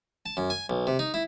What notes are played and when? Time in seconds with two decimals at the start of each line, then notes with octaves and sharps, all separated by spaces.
0.26 A5
0.37 F#2
0.50 G#5
0.70 B1
0.87 C3
0.99 D#4
1.14 E4